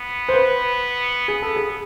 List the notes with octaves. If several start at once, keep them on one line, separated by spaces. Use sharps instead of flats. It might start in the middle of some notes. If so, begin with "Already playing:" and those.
Already playing: B3
C5
B4
B3 G#4
A4
G#4